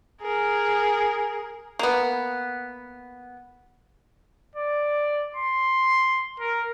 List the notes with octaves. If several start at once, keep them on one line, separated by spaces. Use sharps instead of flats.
G#4 A#4
A#3 B3
D5
C6
A#4